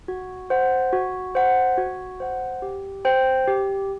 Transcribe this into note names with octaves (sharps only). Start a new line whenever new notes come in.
F#4
C5 F#5
F#4
C5 F#5
F#4
C5 F#5
G4
C5 G5
G4